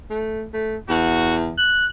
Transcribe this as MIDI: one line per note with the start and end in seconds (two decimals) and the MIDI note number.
0.10 0.46 57
0.53 0.76 57
0.89 1.57 40
0.89 1.35 66
1.58 1.87 90